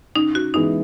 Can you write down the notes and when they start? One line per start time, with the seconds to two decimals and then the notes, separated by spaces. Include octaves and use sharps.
0.15 C#3 D#4
0.35 F#4
0.54 E3 G#3 B3 D#4 E4